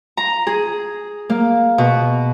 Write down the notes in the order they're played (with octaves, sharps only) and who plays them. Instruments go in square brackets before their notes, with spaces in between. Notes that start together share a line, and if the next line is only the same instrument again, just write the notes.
[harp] A#5
G#4
A#3
B2